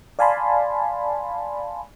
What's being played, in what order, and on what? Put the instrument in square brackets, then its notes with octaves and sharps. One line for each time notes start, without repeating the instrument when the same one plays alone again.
[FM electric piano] D5 F5 G#5 A5 B5 C6